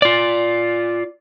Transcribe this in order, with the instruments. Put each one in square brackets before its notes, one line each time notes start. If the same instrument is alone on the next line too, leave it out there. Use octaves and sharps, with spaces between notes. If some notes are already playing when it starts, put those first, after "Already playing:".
[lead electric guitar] F4 D5